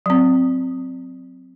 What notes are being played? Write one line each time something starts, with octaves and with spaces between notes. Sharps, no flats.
F#3 C4